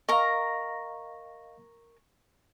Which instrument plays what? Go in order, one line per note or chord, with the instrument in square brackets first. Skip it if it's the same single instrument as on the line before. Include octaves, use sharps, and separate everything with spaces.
[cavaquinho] A#4 A#5 [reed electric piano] D#5 F5 [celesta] C#6